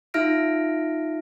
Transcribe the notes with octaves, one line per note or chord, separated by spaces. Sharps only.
D#4 F4 E5 F6 A#6 D7